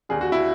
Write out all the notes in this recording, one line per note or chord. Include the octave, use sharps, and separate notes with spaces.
D#2 D3 G#4
F#4
E4